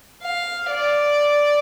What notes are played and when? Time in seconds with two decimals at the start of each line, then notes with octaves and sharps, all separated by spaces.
0.22 F5
0.70 D5